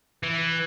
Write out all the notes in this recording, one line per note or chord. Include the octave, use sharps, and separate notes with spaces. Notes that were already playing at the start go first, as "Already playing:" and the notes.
E3